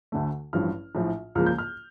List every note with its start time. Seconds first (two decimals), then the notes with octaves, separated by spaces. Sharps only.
0.12 D2 D3 A3
0.53 A1 G2 F3 F6
0.95 A#1 A2 F3
1.35 C#2 C#3 F3 A#3 F6
1.46 G6
1.58 F6